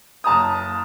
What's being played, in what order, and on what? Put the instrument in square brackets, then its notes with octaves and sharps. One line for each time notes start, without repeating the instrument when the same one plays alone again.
[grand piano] F#1 A5 A#5 D#6